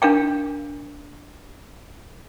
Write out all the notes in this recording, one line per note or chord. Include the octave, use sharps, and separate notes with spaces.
D4 A#4 F5 G5